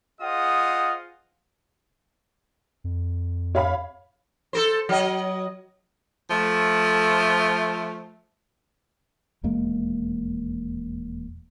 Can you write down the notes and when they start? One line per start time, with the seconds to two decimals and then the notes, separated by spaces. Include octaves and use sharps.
0.21 F4 G#4 C5 D#5 F#5 D#6
2.84 F2
3.55 C#5 F5 B5
4.53 A4 A#4 C5
4.89 F#3 D#5
6.31 F3 A3
9.44 D#1 E2 G#3 A#3